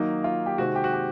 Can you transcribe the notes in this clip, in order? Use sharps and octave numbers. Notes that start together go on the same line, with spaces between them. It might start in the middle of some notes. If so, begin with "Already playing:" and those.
Already playing: D#3 F#3 A#3 D#4
F4
G4
C3 D#3 G#3 C4 F#4
G4
F#4
G4